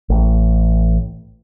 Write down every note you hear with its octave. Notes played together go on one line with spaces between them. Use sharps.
A1